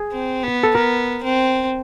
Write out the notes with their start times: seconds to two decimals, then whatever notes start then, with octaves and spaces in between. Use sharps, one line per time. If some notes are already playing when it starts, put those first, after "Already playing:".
Already playing: G#4
0.12 C4
0.43 B3
0.63 A4
0.75 B3 A#4
1.23 C4